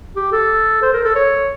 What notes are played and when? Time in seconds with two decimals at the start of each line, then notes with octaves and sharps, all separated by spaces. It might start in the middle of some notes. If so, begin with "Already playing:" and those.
0.16 G4
0.32 A4
0.82 C5
0.93 A#4
1.04 A4
1.15 C#5